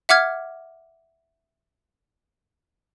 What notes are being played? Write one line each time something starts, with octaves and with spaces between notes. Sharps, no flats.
E5 F#5 D6 F6 G#6